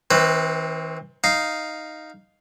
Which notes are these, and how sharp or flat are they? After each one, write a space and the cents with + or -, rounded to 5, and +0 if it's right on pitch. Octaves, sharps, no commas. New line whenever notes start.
E3 -45 C4 +15 B4 +10
D#4 +0 F5 +0